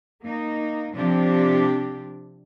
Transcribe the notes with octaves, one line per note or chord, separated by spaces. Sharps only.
A#3 D#4
C3 F3 C4 D4 G4